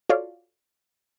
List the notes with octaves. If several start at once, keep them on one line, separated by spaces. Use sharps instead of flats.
F4 F#4 A4 C#5 D5 F5